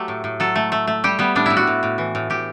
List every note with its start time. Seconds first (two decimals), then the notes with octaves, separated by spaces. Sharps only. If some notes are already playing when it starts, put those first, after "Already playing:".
Already playing: F#3 A3 G4
0.08 A2
0.24 A2
0.40 F#3 A4
0.56 A3
0.72 A3
0.87 A3
1.04 G3 G4
1.19 G3 B3
1.35 A2 D4
1.46 A2 E4
1.57 F#4
1.67 A2
1.83 A2
1.98 E3
2.15 A2
2.30 A2 G4